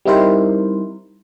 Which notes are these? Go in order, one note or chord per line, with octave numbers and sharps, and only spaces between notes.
G3 C4 D#4 E4 A#4 C5